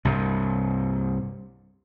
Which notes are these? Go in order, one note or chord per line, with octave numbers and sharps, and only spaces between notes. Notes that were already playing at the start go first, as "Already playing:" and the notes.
C2 G2 C3